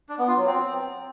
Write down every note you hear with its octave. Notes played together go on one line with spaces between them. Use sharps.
D4
B3
F4
F#3
C4